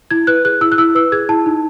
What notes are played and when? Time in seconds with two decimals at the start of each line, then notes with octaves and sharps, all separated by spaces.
0.11 E4 G#6
0.27 B4 F#6
0.45 G#4 F#6
0.61 E4 E6
0.72 F#6
0.78 E4 E6
0.95 B4 E6
1.12 G#4 G#6
1.29 E4 A5
1.46 D#4